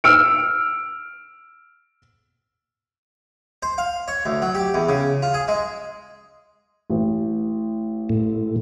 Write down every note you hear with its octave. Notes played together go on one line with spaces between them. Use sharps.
E6 F6 D7
C5
F5
C#5
D2
F#3
G4
E2
C#3
F4
G#4
G#3
A1
A2